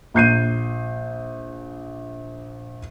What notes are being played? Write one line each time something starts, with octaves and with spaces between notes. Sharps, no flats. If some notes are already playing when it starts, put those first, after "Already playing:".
A#1 G6 C7 D#7